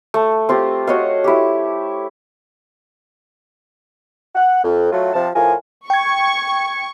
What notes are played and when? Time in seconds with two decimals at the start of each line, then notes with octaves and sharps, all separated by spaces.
0.14 A3
0.49 C4 F4 G4
0.87 F#4 C#5 D#5 F5
1.24 E4 G4
4.35 F#5
4.63 F2
4.92 F#3 A3 F4
5.14 C3 F3 A5
5.35 A2 F3 F4 A#4 G#5
5.90 G5 C#6 G#6